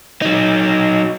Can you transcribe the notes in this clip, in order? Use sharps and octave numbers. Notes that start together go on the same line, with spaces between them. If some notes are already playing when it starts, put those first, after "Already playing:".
F#3 D#4